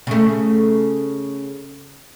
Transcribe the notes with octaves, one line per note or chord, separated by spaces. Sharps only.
C#3 A3